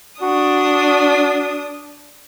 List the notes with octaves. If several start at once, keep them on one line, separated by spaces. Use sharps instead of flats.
D4 F#4 D#6